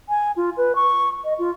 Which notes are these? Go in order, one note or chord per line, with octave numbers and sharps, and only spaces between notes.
G#5
F4
B4
C#6
D#5
F4